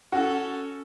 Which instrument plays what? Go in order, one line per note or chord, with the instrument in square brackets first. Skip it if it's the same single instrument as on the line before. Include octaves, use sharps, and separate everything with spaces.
[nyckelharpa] C#4 A4 [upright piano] F#4